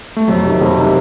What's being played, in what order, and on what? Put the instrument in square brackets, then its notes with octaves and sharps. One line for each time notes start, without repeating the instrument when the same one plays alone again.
[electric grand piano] A3
[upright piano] F2 [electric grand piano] F#3
[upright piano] C3 D#3
F2
C3 D#3